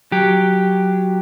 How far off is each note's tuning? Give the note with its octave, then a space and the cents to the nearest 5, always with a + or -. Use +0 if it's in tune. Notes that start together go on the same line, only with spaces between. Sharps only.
F#3 +0 G4 +0